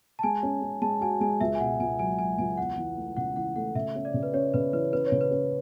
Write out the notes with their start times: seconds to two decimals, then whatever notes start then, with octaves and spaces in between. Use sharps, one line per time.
0.19 A5
0.23 G#3 G#5
0.43 C#4
0.62 C#4
0.82 G#3 A5
1.01 F#4 G#5
1.21 G#3 G#5
1.41 C#2 E5
1.55 G#5
1.60 B2 F#5
1.80 C#2 G#5
1.99 F#3 G#5
2.19 F#3 G#5
2.38 C#2 G#5
2.57 E2 F#5
2.78 E3
2.97 A3
3.17 C#3 F#5
3.36 E3 F#5
3.56 A3 F#5
3.75 C#3 E5
3.95 C#4
4.05 D5
4.14 C#3
4.23 B4
4.34 C#4 C#5
4.54 C#3 B4
4.73 E3 B4
4.93 C#4 B4
5.06 C#5
5.12 C#3
5.21 B4
5.31 C#4